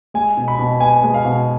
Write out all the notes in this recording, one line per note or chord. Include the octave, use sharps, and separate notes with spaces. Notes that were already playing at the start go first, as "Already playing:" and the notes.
G#3 G#5
B2
B5
B2
B3 G#5
G#3
F5
B2